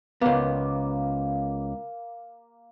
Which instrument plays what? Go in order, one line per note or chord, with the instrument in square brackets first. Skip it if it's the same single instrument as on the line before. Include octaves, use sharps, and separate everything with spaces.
[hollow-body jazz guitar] C#2 B3 [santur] A#3